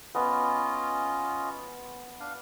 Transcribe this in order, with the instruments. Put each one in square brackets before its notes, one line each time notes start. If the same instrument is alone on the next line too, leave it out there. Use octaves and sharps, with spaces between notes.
[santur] B3 [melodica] C#4 F4 D#5
[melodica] D4 F5